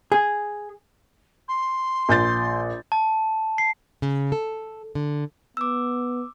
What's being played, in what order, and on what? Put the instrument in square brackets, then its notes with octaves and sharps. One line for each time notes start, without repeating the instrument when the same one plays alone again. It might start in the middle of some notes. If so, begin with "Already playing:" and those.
[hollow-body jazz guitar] G#4
[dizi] C6
[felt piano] A#1 G6 A6
[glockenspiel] A5
C7
[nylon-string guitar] C#3
A4
D3
[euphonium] B3 [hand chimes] D6 E6